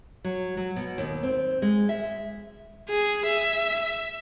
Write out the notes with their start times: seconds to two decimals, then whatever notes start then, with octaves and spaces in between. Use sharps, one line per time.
0.24 F#3
0.57 F#3
0.76 B2
0.98 D#2
1.23 C4
1.62 G#3
1.89 E5
2.89 G#4
3.26 E5